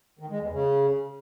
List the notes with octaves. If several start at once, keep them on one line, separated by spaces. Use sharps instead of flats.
D#3
G#3
E2
C#3